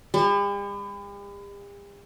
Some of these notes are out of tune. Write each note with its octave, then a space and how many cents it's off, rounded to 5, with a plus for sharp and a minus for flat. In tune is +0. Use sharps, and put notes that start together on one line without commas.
G3 +45